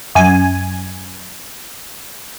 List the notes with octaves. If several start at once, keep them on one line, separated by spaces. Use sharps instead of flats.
F#2 G#5